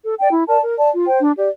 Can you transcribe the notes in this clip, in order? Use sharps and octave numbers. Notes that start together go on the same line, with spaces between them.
A4
D5 G5
E4
A#4 D5 A5
A#4
D5 A5
F4
C5 G5
D4
G4 D5